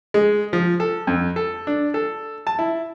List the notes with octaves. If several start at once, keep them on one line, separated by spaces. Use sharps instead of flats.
G#3
F3
A4
F2
A4
D4
A4
A5
E4